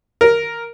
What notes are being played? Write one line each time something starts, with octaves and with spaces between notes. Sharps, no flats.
A#4